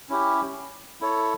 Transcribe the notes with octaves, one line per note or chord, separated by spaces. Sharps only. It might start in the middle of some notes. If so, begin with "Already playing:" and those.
C#4 E4 G4
E4 A4 C#5